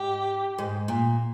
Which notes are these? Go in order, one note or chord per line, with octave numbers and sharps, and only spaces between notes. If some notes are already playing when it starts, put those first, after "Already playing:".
Already playing: G#2 G4
G#2
A#2